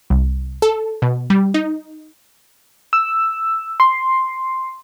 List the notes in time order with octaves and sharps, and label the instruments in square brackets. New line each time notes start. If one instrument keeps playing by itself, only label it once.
[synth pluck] C2
A4
B2
G3
D#4
[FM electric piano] E6
C6